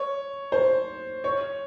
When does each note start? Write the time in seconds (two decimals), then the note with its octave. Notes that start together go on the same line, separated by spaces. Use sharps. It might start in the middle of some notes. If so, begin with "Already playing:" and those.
Already playing: C#5
0.52 C5
1.24 C#5